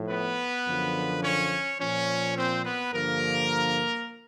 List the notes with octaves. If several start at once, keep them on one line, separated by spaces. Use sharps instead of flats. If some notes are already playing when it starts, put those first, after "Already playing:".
Already playing: A2 F3
B3 B4
F#2 D3 F3
C#4 C#5
A#2 F3 C#4 C#5
C4 C5
B3 B4
G2 D3 F3 A#3 A#4